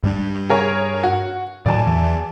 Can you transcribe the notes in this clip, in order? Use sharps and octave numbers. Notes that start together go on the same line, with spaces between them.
G2 G3 D4
G#4 A#4 C#5
F#4
A2 D#3 F#3 D5 G#5 A5
E2 E3